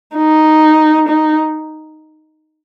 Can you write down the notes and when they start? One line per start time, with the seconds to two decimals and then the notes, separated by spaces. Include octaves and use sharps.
0.16 D#4
1.09 D#4